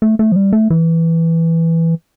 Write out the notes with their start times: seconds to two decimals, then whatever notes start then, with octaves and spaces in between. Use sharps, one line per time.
0.02 A3
0.19 A3
0.32 F3
0.36 G3
0.53 A3
0.70 E3